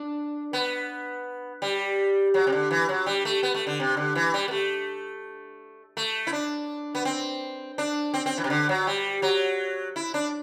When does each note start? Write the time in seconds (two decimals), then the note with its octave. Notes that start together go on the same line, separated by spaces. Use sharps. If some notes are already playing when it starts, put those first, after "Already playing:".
Already playing: D4
0.53 B3
1.62 G3
2.34 F#3
2.47 C3
2.52 D3
2.71 E3
2.89 F#3
3.06 G3
3.25 A3
3.43 B3
3.54 A3
3.67 D3
3.80 C3
3.97 D3
4.15 E3
4.34 G3
4.48 B3
4.51 A3
5.97 A3
6.27 E4
6.32 D4
6.95 B3
7.05 C4
7.78 D4
8.14 C4
8.26 C4
8.38 E3
8.44 C3
8.50 D3
8.69 F#3
8.87 G3
9.22 F#3
9.96 E4
10.14 D4